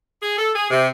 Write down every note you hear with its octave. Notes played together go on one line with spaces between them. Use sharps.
G#4
A4
G#4
C3